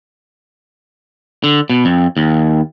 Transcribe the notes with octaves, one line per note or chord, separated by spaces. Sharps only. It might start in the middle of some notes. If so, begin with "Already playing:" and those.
D3
B2
F2
D#2